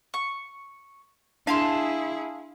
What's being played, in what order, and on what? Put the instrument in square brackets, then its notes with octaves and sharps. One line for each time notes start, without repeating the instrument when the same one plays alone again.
[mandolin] C#6
[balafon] D4 [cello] E4 G#4 [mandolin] F5 A5 C6